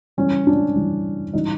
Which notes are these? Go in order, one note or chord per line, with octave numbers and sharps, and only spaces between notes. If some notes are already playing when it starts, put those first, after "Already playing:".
C#3 E3 G3 C#4
D4
C#3 E3 G3
C#3 E3 G3 D#4